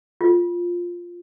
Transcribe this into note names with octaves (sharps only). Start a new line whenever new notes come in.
F4